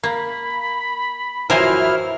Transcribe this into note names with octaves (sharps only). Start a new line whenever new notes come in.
A#3 B5
F#2 E3 F3 E4 A#4 C5 G#5 F6